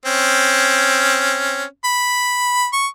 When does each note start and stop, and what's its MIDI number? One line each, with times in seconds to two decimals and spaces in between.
0.06 1.64 60
0.06 1.64 61
1.84 2.67 83
2.73 2.87 85